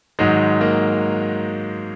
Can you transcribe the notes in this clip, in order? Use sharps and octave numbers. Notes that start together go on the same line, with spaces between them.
G#2 D#3 F#3 G#3
A#3